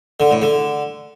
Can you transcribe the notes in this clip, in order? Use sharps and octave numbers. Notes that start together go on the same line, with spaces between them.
D3
A2
D3